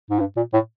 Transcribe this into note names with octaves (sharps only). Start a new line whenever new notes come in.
G#2
G2
A#2
A2